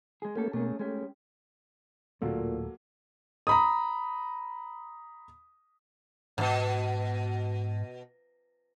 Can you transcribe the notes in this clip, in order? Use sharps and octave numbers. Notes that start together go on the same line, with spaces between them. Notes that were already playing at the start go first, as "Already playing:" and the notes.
G#3 G#4
A3 A#3 C#4 G4 A4
B2 A3 A#3 C#4 G#4
G#3 A3 C#4 G4
D1 D2 A#2 F#3 A3 A#3 F4 A4
A#5 B5 D#6
F2 G#2 B2